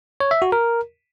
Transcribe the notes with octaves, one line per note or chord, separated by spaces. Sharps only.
C#5
E5
F#4
A#4